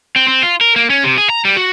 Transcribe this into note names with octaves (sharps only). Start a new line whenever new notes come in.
C4
C4
F4
A#4
A#3
C#4
C3
G#4
A#5
G3
F#4